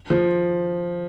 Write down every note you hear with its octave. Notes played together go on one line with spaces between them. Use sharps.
F3